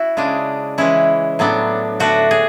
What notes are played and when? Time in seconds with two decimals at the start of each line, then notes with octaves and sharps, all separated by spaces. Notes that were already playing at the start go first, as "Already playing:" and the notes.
Already playing: E4 F#4
0.17 C#3 G#3 D4
0.78 E3 G#3 C#4 E4
1.39 A2 F#3 B3 D4
2.00 D3 A3 D4 F#4
2.31 G#4